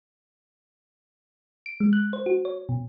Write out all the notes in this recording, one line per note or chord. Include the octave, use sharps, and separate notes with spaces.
D7
G#3
F#6
C5
F#4
C#5
B2